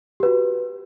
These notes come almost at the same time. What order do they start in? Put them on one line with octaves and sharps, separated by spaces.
G4 B4 F#4